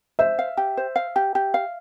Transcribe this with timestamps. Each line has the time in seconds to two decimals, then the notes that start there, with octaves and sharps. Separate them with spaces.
0.19 C5 E5
0.39 F5
0.57 G4
0.77 C5
0.96 F5
1.16 G4
1.35 G4
1.54 F5